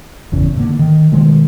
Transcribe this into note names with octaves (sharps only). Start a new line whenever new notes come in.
G1 E2 C#3
G#2 D3 A#3
D#3
B2 D#3 G3 G#3